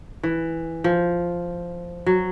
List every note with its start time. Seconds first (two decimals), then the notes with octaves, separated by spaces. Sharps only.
0.23 E3
0.84 F3
2.06 F#3